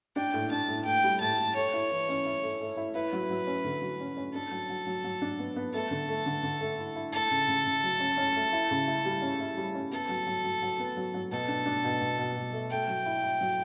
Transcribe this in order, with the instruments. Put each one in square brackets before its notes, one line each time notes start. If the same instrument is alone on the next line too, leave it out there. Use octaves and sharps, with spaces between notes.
[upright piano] D4 [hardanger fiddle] G5
[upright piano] A2
[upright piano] D4 [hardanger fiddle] A5
[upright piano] A2
[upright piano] A2 [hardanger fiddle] G5
[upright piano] G3
[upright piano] A2 [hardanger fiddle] A5
[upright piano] A2
[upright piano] A3 [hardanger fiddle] C#5
[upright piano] E4
E3
C#4
E4
A3
A3
E4
[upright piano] E4 [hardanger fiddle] B4
[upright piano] F#3
F#3
C#4
D3
F#3
C#4
C#4
[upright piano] D4 [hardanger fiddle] A4
[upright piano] F#3
F#3
F#3
F#3
D4
B3
B3
[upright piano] A3 [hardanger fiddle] A4
[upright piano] D3
A3
D3
D3
A3
E4
E4
[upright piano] A3 [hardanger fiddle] A4
[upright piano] C#3
C#3
C#3
F#3
C#4
C#4
A3
E4
C#3
E4
G3
C#4
E4
G3
C#4
[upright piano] B3 [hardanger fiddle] A4
[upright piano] F#3
F#3
F#3
F#3
B3
F#3
F#3
[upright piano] B2 [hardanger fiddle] A4
[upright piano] D4
D4
B2
B2
B2
B2
A3
[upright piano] A3 [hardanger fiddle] G5
[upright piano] F#3
E4
E4
F#3